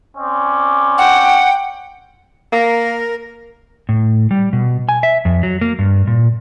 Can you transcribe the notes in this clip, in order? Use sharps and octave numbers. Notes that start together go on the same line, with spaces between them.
C4 C#4 D5
F#5 G5
A#3 A#4
A2
G3
B2
G#5
E5
F2
F#3
A#3
G2
A#2